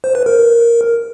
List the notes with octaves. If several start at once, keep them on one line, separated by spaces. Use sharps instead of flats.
C5
B4
A#4
A#4